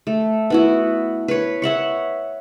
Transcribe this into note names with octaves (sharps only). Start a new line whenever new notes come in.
A3
B3 E4 F#4
B4 C#5
C#5 E5 F#5 C#6